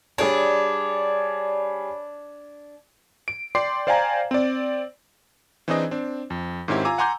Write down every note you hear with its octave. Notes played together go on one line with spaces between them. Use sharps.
G3 D4 G#4 C#5
D7
D5 G5 C6 D6 C7
C5 D5 F5 G5 G#5 A#5
C4 D5
E3 C4 D4 D#4 G#4 D#5
C4 D4
F2
G#2 D#3 C4 C#4 E4 G4
F4 G#5 A#5 D6 E6
F#5 G#5 A#5 C6 D6 G6